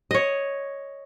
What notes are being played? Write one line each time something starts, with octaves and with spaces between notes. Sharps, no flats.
C#5 D#5